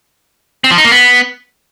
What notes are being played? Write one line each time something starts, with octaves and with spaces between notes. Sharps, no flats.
C4
F3
D#4
A#3
B3